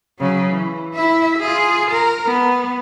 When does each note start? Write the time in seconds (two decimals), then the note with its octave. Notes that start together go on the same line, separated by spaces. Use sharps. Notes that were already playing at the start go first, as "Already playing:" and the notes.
0.19 C#3 F#3
0.52 E3
0.94 E4 E5
1.39 F4 G#4
1.91 A#4
2.26 B3